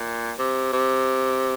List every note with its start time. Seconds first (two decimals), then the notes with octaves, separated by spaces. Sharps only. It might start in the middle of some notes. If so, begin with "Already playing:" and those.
Already playing: A#2
0.39 C3
0.73 C3